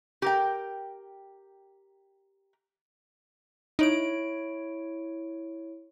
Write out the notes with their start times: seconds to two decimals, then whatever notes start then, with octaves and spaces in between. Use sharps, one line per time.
0.22 G4 A#4 G5
3.79 D#4 E4 C#5 D7